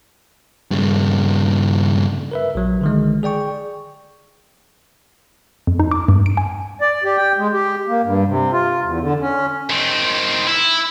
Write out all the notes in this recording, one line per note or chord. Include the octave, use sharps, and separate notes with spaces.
G2 C#3
A#4 B4 E5
A#1 F#3
D3 D#3 G#3
G#4 D5 G5 C#6
F2
D#4
D6
G2
D7
G#5
D5
G4
G5
G#3
G4
A#3
G2
C3
F4
E2
D3
C#4
D#3 C4
E4